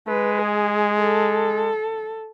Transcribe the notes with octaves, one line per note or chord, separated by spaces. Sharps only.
G#3 B4
G#4
A4